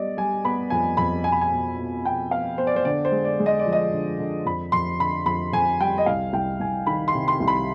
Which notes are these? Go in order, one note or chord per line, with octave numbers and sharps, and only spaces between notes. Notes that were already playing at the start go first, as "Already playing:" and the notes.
Already playing: G3 B3 D5 D#5
G3 G#5
B3 B5
F2 G#5
F2 B5
B2 G#5
B5
G#5
B2
B2
B2 G5
B3 F5
B3 C5
D5
C5
D3 D5
C5
G#3
D5
G#3
D#5
D5
F3
D#5
D3
D3
F2 B5
F2 C6
D3 B5
F2 B5
F2 G#5
G3 G5
D#5
C2 F5
C2 G5
C2 G#5
D#3 B5
C6
C3
C6
C2
B5